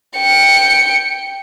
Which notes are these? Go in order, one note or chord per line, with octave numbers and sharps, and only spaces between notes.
G5 C#7